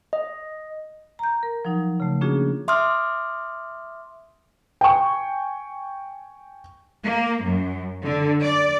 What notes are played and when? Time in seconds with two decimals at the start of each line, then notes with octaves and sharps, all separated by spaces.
0.13 D#5
1.19 A#5 G6
1.43 A#4
1.65 F3 F#3 D#4
2.00 C#3 A3
2.21 A#3 C#4 D4 F4 F#4 G#4
2.68 E5 C6 D6 D#6 F6
4.81 G5 G#5 C#6
7.03 A#3
7.43 F#2
8.04 D3
8.42 D5